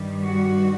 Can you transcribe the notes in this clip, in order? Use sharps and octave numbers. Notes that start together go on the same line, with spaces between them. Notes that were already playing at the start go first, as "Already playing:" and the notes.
Already playing: G2 D#3 G3
F#4